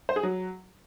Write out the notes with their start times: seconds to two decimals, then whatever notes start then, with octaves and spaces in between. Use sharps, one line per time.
0.09 C5
0.16 G#4
0.23 F#3